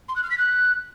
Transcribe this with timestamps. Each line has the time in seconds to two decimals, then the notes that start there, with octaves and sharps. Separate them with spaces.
0.08 C6
0.15 F#6
0.23 F6
0.30 B6
0.38 F#6